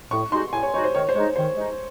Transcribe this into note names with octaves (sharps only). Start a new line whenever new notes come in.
A2 C#6
G#3 D#4 F#4 C6
A2 G#5
C#5
G#3 D#4 F#4 C#5
C5
D#3 C#5
C5
G#3 D#4 C#5
D#3 C5
G#3 D#4